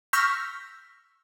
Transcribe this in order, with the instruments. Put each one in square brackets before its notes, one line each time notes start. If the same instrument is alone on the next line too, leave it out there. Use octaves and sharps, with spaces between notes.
[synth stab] C#6 E6 F6 G6 A#6 B6